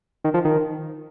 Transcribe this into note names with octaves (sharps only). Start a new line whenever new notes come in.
D#3
F3
D#3